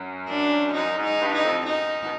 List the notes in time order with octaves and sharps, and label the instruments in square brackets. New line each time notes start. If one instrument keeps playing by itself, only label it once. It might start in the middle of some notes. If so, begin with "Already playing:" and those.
Already playing: [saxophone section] F#2
[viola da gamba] D4
[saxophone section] F#2 [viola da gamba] D#4
[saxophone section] G#2
[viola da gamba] D#4
[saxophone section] G2
[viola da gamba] D#4
[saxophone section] F2
[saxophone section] F#2 [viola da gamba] D#4
[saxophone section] B2